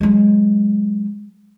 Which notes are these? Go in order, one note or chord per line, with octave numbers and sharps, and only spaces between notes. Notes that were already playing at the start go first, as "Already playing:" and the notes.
F#3 G#3